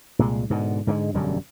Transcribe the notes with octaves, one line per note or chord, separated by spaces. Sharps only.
C2 A#2 G#3
G#2 B2 D3
G#2 D3 F3 G#3
E1 F#2 D3 G3